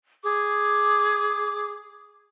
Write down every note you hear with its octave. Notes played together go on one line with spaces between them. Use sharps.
G#4 D6